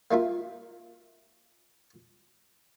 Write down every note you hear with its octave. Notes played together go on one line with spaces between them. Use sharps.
A#3 D#4 F4 E5